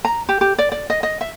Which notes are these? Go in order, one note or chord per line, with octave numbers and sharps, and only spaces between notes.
A#5
G4
G4
D5
D5
D#5
D#5
E5